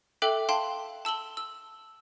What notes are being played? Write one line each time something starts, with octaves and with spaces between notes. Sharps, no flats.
A4 E5 G5 D6 F#6 F#7
F5 G5 A5 C6
A5 E6 F#7 G7
E6